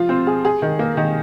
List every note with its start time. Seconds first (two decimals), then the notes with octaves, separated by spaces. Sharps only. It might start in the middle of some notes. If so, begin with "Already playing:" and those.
Already playing: F3 F4
0.09 C4
0.27 G#4
0.45 G#4
0.62 D#3
0.79 A#3
0.97 D#3